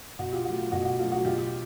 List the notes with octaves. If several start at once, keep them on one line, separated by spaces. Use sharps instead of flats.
B2 F#4
F4 G4
F#3 A3 F#4
F4
B2 F#4
F#4
F#3 A3 F4
F#4
B2 F4 G4